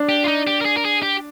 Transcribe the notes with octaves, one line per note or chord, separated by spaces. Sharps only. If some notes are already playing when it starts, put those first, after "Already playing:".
Already playing: D4
G4
F4
D#4
G4
A#4
G#4
A#4
G#4
G4